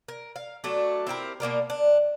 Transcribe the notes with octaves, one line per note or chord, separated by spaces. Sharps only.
A#4
F5
F#3 A3 D4
C4 E4 G4 A#4
B2 A#3 D4 A#4
D4